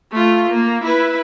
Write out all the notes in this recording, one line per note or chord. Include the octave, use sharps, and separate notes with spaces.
A3 F4
A#3
E4 B4